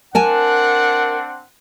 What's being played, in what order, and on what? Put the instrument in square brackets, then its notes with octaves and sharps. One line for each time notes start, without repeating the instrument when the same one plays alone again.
[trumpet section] C4 D4 F#5 [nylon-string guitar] A#4 G#5 A5